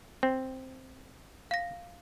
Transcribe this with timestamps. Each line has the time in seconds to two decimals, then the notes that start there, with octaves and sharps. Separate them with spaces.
0.23 C4
1.51 F5 A#6